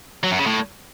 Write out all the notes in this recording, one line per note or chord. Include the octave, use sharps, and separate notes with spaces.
F#3
F#2
C#3
A2